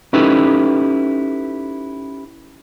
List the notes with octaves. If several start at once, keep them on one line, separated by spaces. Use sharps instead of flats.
C#4 D#4 E4 G4 A4 B4